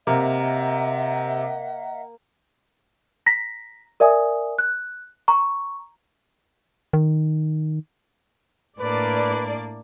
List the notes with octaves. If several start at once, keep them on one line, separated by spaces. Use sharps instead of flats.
C3 A#3 D#5 E5 F#5
A#5 A#6 B6
A#4 D5 E5 G#5 D#6
F#6
A#5 C#6
D#3
A2 A#3 D4 B4 D5